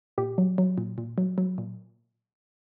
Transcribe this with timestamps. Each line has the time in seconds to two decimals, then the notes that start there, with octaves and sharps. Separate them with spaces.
0.18 A#2 G4
0.38 F#3
0.58 F#3
0.78 A#2
0.98 A#2
1.18 F#3
1.38 F#3
1.58 A#2